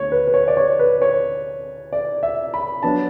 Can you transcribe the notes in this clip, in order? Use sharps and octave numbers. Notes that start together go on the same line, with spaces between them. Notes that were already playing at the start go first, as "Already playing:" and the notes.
Already playing: D2 D3 B3 C#5
B4
B4
C#5
D5
C#5
B4
C#5
D5
E5
B5
F#3 B3 D4 A5